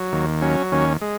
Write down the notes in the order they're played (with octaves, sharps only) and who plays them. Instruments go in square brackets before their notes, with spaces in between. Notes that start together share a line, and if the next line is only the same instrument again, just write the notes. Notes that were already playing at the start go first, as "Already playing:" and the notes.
Already playing: [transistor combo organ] F#3
D#2
F#3 C#4
D#2 C#4
G#3